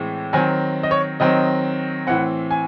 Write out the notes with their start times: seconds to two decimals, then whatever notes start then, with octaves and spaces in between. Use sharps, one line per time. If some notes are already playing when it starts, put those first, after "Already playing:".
Already playing: A2 E3 G#3 C4
0.33 D#3 F#3 C4 G#5
0.83 D#5
0.91 C#5
1.20 D#3 F#3 C4 D#5
2.07 A2 E3 C4 F#5
2.51 G#5